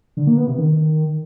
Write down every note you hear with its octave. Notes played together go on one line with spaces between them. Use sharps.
D3
A#3
B3
C3
D#3